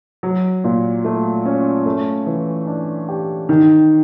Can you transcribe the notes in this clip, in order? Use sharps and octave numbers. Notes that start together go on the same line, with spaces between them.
F#3
A#2
A3
C#4
A3
E3
D4
G4
D#3